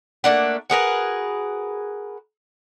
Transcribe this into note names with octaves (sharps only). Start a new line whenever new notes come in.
A3 A#3 D4 F#5
F#4 G#4 A#4 B4